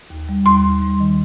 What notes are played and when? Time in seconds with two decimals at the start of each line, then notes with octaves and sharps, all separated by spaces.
0.10 D#2
0.29 G3
0.46 D#2 C6
0.65 D#2
0.82 G3
1.00 D#3